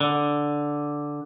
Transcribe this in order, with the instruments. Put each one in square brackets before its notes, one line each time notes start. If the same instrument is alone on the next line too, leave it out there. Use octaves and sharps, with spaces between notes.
[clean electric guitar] D3